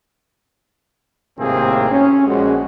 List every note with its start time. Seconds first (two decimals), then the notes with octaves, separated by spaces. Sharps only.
1.39 G#1 A2 C3 A#3 C4 G#4
1.91 C#4
2.27 A#1 G#3 F#4